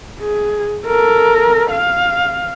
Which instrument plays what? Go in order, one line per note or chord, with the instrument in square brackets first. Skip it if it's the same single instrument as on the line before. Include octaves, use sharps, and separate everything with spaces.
[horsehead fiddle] G#4
A4 A#4
F5